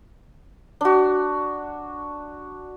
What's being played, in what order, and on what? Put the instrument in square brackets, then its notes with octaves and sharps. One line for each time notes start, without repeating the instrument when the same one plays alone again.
[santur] D4 F#4